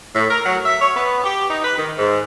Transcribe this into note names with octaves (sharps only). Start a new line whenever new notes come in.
A2
A#4
F#3
E5
C#5
B3
G4
D#4
B4
D#3
G#2